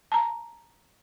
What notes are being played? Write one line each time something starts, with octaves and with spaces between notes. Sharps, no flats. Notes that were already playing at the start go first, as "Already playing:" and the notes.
A5 A#5